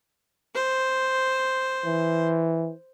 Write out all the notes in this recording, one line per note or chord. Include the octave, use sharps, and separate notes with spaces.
C5
E3